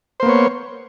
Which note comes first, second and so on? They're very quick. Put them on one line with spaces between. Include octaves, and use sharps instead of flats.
C5 A#3 B3 C#5